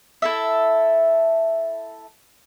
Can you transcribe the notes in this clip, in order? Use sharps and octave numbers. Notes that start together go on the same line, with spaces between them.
E4 A4 E5